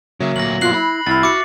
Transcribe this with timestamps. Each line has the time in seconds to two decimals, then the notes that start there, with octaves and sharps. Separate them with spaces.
0.20 C#3 F#3 A#3 E5
0.36 D2 A#2 A#6 F#7
0.61 G2 B2 F4 F#6 C7 F#7
0.74 E4 B5
1.06 C2 E4 F6 A6
1.23 F#4 E5 D6 C#7